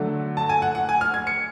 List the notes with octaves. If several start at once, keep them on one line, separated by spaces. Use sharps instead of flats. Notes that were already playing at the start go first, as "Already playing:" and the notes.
Already playing: D3 F#3 A3 D4
A5
G#5
F#5
F#5
G#5
F6
G#6
C#7